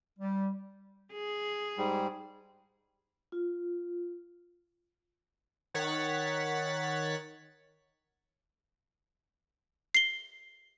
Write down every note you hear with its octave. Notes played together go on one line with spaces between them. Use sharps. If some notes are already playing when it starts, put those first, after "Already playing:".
G3
G#4
G#2 G3
F4
D#3 C#5 F#5 A6 B6
C7 G7